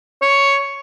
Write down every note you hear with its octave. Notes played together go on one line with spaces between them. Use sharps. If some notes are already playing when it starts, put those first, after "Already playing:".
C#5